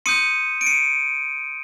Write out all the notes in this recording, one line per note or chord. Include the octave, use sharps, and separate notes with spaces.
C6 D#6 G6 C#7 D#7
D7
C#7 D#7